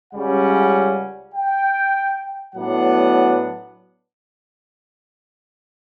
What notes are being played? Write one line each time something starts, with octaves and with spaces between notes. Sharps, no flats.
C#2 C#3 G3 C#4 F#5
G5
A2 F#3 B3 D4 F#5